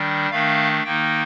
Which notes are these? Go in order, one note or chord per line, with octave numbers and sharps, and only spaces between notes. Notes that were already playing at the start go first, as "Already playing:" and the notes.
Already playing: D#3 G3 D4
D#3 A3 D4 F5
D#3 A#3 D#4 G5